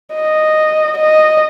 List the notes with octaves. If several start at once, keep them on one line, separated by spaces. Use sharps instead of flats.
D#5
D#5